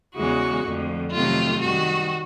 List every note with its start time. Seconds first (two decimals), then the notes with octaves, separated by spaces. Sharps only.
0.15 E2 C#3 E3 G#3 F#4
0.64 F2 D3 F3 A3
1.11 F2 C3 D#3 F#3 A3 F4
1.60 F#2 D#3 G3 F#4